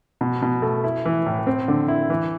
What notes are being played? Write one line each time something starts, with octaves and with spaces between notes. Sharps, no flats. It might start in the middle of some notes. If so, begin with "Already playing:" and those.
B2
B2
A3
E4
E3
A2
C4
D3
E4
E3